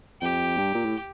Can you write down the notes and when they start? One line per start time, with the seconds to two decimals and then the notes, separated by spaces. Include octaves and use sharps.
0.21 F2 G4
0.57 G2
0.74 A#2
0.85 A2